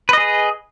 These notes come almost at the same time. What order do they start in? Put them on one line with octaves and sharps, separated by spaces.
B4 D#5 G#4